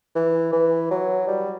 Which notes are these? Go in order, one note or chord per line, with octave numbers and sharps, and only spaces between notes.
E3
E3
F#3
G3